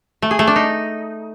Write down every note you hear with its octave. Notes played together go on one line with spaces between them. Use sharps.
A3
G#4
A3
D4
D#4